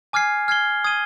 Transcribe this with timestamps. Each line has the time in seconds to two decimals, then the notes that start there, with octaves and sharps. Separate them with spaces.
0.13 G#5 D6 F6 G#6 C7
0.48 F6 G#6 C7 G7
0.84 D#6 G#6 D#7 G7